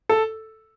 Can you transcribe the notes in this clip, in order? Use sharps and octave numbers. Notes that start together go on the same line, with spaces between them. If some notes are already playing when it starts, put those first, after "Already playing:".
A4